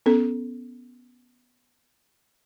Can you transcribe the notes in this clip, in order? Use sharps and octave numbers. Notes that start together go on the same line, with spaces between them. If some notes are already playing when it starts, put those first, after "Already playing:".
B3 C#4 A4